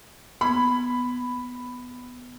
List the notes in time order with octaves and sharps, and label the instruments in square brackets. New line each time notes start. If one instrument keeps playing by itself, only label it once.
[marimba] A#3 B3 G#6 [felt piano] B5